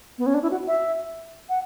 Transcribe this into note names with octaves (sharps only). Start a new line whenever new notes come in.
B3
C#4
D4
E4
F#4
E5
F#5